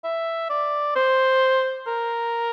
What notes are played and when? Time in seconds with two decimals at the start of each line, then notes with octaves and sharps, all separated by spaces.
0.04 E5
0.50 D5
0.96 C5
1.87 A#4